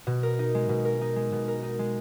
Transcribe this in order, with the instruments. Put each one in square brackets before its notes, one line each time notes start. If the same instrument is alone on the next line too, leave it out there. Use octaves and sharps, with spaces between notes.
[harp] B2
A#4
D#4
G#3
B2
A#4
D#4
G#3
B2
A#4
D#4
G#3